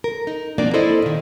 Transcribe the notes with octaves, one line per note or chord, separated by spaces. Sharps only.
A#4
D#4
B2 F3 A#3 C4 D4 D5
E4 A4 C5 D5 D#5
A#2 D#3